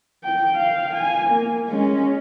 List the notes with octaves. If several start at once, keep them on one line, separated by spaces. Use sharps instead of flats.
G5
F5
G#5
A#3
G#3 C#4